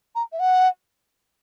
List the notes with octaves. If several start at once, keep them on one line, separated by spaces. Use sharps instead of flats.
A#5
E5
F#5